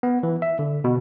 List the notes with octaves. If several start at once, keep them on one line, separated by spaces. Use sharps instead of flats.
B3
E3
E5
D3
B2